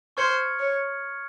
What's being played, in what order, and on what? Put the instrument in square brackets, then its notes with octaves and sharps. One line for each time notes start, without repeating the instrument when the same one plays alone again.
[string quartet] C5 [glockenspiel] C#6 F6 G#6 C#7 F#7
[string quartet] C#5